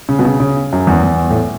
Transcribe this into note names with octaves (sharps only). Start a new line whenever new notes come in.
C#3
B2
C#3
C#3
F#2
E2
E2
A2